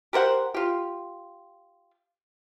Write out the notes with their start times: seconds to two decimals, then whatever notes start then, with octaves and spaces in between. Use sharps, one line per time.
0.13 G4 A#4 C5 F#5
0.54 F4 G4